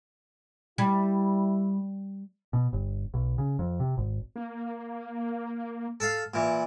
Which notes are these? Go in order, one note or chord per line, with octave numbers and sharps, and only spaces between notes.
G3 E4
B2
G1
B1
C#3
F2
C3
G#1
A#3
A4 F5
A#2 E3